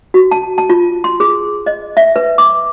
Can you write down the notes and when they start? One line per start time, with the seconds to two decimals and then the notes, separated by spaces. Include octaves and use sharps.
0.14 F#4
0.31 A5
0.58 A5
0.70 F4
1.04 C6
1.20 G#4
1.66 D#5
1.97 E5
2.16 B4
2.38 D6